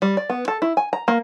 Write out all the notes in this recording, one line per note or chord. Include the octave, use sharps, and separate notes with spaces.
G3
D5
B3
A4
E4
G#5
A#5
A#3